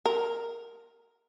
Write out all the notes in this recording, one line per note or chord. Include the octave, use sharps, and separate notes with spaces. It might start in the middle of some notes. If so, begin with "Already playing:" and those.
A#4